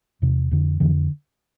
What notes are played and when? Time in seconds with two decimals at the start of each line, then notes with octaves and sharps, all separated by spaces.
0.22 E2 C3
0.51 F2 D3
0.80 F2 D3 E3